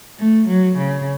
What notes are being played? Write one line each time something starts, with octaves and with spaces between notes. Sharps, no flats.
A3
F#3
C#3